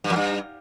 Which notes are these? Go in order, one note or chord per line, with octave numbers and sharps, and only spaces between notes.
G2
F2
G2